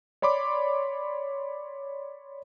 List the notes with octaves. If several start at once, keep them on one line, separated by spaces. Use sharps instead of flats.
C#5 D5 B5 C6 D6